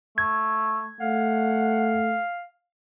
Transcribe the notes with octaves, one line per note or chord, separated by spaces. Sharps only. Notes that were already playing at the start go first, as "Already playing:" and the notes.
A3 G#6
A3 F5 F#5